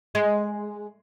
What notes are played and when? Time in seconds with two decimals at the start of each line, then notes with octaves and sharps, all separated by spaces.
0.15 G#3